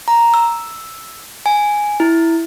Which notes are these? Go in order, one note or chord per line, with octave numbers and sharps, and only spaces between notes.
A#5
E6
G#5
E4